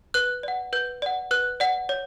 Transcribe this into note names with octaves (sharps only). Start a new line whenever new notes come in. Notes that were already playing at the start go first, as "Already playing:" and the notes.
B4 F#6
D5 F#5
B4 G6
D5 F#5
B4 F#6
D5 F#5
C#5